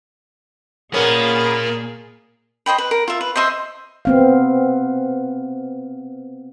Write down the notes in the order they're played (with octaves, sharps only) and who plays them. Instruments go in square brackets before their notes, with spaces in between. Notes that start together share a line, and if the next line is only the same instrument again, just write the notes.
[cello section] A#2 G#4 [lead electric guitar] A#3 F4 [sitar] B3 C#4 [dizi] A#4
[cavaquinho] C5 D#5 G5 B5
B4
A#4
F4 E5
B4
C5 D#5 E5 C6
[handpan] B3 C4 F5